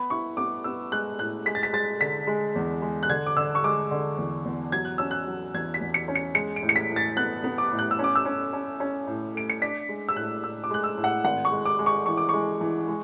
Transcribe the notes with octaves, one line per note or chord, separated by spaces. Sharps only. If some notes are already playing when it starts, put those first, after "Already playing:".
Already playing: B3 B5
E4 C#6
B3 D6
B3 E6
G#3 F#6
A2 F#6
G#3 B6
A6
B6
G#3 A6
D3 B6
G#3
E2
G#3
F#6
D3 G#6
D6
D3 E6
C#6
G#3 D6
D3
E2
E2
F#3 G#6
F#6
C#4 E6
F#6
F#3
E2 G#6
B6
E2
C#7
C#4
C#7
G#3 C#7
D7
A2
C#7
B6
A2
A6
B3 F#6
B3
D6
A2
F#6
E6
C#4
D6
E6
C#4
C#4
C#4
A2
A3 D7
C#7
D4 B6
G#3
E6
A2 F#6
A2 E6
D6
G#3 F#6
E6
A2
F#5
G#1 F#5
C#6
G#3
D6
G#3
C#6
E3 C#6
D6
G#3 C#6
E3
G#3